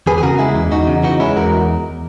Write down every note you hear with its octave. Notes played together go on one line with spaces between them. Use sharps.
E2 G#4 B4
G#4
C#3 F#4 A#4
G#3 E4 G#4
E2
E2 D#4 F#4
C#3
E3 D#4 F#4
G#3 C#4 E4
E2 F#4 A#4